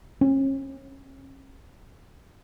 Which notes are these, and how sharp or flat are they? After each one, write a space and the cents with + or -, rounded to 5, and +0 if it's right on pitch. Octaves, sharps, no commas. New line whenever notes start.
C#4 -40